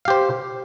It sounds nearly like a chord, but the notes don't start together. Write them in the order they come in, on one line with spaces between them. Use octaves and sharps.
F5 G4 C5